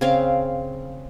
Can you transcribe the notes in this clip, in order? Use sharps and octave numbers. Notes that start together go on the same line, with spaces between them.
C#3 C4 F5